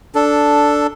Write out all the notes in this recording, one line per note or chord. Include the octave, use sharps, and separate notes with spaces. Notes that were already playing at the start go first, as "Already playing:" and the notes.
D4 A4